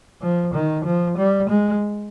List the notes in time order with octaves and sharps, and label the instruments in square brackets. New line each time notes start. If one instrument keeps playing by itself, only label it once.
[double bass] F3
D#3
F3
G3
G#3